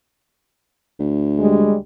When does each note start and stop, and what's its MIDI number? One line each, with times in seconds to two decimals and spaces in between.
0.99 1.80 38
1.39 1.75 55
1.39 1.75 56